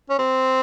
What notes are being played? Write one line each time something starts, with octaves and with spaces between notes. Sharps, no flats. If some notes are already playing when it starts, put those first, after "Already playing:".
C#4
C4